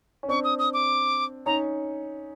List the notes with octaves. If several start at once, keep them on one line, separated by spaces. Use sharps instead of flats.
C#4
C4 D4 C#6
D#6
D#6
D6
C#4 D#4 A#5